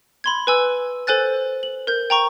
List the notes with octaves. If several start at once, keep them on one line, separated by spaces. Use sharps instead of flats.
B5 C6 G#6
B4 G#5 E6
A4 C5 G#5 F#6 A6
F#7
A#4 G6
G5 A#5 C#6